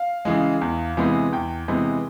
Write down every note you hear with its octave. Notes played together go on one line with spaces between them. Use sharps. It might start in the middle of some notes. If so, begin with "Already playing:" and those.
Already playing: F5
C#3 E3 G#3
E2
C3 E3 G#3 B3
E2 G5
C3 E3 G#3 B3